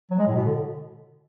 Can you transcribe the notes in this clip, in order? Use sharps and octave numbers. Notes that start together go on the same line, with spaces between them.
F#3
G#3
A2
B2
D3